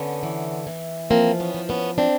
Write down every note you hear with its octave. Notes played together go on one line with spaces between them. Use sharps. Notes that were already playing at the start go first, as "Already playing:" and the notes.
Already playing: D3 B3 C#4
E3
E3
F3 A#3 C4
B3 C#4
F3
B3 C#4
C4 D4